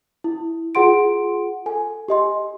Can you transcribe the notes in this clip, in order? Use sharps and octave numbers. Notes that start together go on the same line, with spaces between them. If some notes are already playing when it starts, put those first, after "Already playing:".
E4
F4 G#4 F#5 C6 D7
A4 G#5
G4 D#5 C6